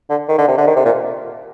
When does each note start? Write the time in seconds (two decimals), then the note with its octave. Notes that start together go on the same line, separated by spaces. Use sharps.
0.10 D3
0.29 D#3
0.38 D3
0.48 C3
0.58 D3
0.67 D#3
0.76 C3
0.85 A#2